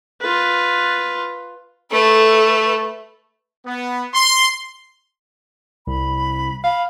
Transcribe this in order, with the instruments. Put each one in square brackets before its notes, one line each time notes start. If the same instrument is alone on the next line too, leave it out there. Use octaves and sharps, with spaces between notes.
[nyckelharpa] F4 B4
[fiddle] A3 B4 [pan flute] A4
[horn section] B3
C6
[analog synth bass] C2 [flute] B5
[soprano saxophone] F5 [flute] B5